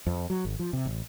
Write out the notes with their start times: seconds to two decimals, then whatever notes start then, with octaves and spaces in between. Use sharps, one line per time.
0.06 F2
0.30 F#3
0.45 G#1
0.59 F3
0.73 C3
0.86 A1